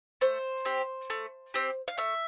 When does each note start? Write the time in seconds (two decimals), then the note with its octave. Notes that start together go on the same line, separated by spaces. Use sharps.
0.21 A3 C5
0.65 C4 G4
1.10 A3
1.54 C4 G4
1.88 F5
1.98 A3 E5